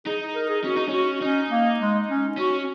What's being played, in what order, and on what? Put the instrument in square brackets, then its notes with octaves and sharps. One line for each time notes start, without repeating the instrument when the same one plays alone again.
[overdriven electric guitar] D#4 [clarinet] G#4
[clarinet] A#4
G#4
[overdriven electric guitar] C#4 [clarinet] F#4
[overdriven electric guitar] D#4
[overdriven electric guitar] C#4 [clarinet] F#4
[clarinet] C#4 [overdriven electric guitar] D#4
[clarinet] A#3
G#3
C#4
[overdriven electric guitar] C#4 [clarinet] F#4